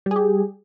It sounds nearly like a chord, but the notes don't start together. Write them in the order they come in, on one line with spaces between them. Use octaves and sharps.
G3 G#4 G4